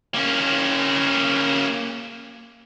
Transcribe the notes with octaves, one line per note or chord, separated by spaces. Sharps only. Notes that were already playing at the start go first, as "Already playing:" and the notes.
A#3 C#4